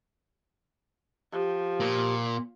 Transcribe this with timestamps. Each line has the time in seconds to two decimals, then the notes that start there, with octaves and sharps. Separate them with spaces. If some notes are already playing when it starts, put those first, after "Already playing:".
1.32 F3 G4
1.80 A#2